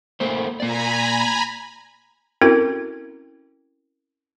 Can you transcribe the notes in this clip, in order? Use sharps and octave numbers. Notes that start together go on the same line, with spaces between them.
A3 A#3 C5
A#3 D5 G#5 A#5 B5
C4 C#4 E4 F#4 A4 A#4